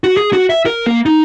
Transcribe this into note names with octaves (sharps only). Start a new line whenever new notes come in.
F#4
G#4
F#4
E5
A#4
A#3
D#4